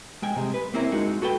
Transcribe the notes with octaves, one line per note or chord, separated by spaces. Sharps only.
G#3 G5 G#5
C3 G#3
B4
A#3 C4 C#4 E4 A#4
G#3 D#4 F#4
F#4 A4 B4 G5